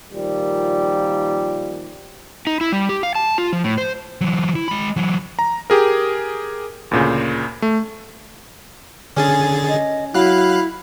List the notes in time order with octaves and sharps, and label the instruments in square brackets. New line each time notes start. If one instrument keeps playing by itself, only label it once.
[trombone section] A#2 D#3 F3 G3
[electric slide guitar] D#4
E4
G3
G4
F5
A5
F4
F3
A2
C5
[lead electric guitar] E3 F#3
E4
G#3 B5
E3 F#3
[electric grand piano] A#5
G4 G#4 A#4
D2 A#2 C#3
A3
[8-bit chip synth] D3 G#4 A6 [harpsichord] C#4
[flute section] D#5
[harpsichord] F#3 [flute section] E4 B5 [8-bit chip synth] F5 F#6